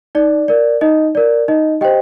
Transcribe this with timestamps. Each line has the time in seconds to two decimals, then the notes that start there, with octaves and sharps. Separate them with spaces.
0.15 D#4 D5
0.48 A#4 D5
0.81 D#4 D#5
1.15 A#4 D5
1.48 D#4 D#5
1.81 G4 C5 D#5 G5